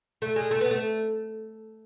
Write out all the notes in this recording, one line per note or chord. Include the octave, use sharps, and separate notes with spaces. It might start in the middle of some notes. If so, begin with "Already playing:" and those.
A3
G#3
A3
B3
A3